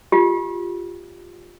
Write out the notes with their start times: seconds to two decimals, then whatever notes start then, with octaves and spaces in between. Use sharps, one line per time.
0.12 F4 G4